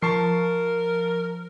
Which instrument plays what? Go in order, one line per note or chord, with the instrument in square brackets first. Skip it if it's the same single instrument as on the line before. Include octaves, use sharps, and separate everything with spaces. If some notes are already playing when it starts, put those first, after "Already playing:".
[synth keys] F3 [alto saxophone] A#4 [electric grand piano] A5 C#6 C7